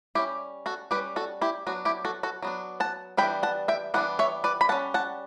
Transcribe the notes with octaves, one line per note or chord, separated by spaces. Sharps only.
G3 C#4 E4 G4
F#4 A4
G3 C#4 G4 B4
F#4 A4
E4 G4
F#3 B3 D4 F#4
E4 G4
F#4 A4
F#4 A4
F#3 B3 D4
F#5 A5
E3 G3 B3 D4 G5 B5
F#5 A5
E5 G5
E3 G3 B3 D4 F#5
C#5 E5
B4 D5
B5
G3 C#4 F#5 A5
F#5 A5